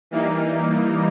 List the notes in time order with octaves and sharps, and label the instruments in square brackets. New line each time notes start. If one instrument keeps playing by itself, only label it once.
[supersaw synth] E3 G3 A#3 D#4